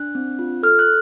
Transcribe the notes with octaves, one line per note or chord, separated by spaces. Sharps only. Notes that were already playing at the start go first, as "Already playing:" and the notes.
Already playing: D4 F#6
C4
F4
A4 F6
F#6